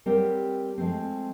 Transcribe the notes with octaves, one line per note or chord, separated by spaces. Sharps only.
G3 C4 G4 A#4 C#5 F#5
F3 G#3 A3 C4